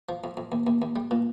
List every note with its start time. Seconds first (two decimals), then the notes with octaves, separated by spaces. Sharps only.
0.09 F3
0.24 F2
0.37 F2
0.52 D#2
0.67 D#2
0.82 D#2
0.96 G3
1.11 A#2